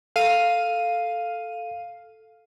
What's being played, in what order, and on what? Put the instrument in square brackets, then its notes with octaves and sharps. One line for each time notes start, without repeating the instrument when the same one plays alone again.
[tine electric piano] A4 [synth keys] F5 D#7